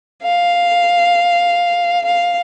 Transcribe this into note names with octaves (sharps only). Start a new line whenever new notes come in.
F5
F5